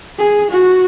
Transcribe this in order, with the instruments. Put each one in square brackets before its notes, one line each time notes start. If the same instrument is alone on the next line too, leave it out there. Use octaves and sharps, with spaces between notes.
[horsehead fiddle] G#4
F#4